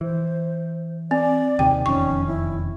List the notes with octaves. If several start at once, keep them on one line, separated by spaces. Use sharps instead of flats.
E3 C5
C4 D5
D#2 C3 D#3 G5
E1 F2 D#3 C#4 C#6
E4